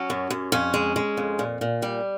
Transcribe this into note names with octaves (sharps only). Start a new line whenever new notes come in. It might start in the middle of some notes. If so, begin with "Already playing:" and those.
Already playing: F#3 C#4
F#2
F#2
F2 C#4
G#3
G#3
F2
A#2
A#2
G3